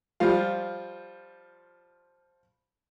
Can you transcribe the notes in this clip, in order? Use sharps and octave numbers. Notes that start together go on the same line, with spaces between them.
F3 G3 F4